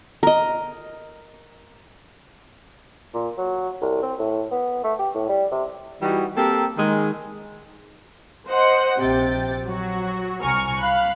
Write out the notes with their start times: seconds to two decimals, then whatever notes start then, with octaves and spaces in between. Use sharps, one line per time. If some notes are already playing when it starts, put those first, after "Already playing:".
0.23 A#4 D#5
3.14 A#2
3.37 F#3
3.82 C2
4.02 C4
4.19 A2
4.51 B3
4.84 A3
4.99 G4
5.15 A2
5.29 G3
5.51 C3
6.02 E3 G3 D#4 F#4
6.37 A#3 C4 G4 A4 A#4
6.78 D#3 G#3
8.47 C5 D#5 F#5
8.99 A#1 C3 G5 A6
9.65 F#3 F#4
10.41 C2 G#5 A#5 C#6 F6
10.80 F5 B5 F#6